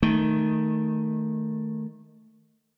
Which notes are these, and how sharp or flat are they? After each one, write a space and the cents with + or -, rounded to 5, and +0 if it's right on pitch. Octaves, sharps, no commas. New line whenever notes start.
D#3 +0 A3 +0